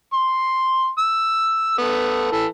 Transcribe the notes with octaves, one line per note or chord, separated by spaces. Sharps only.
C6
E6
A3 B3
E3 A4